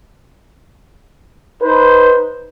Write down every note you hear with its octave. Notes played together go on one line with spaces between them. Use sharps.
D#4 B4 C5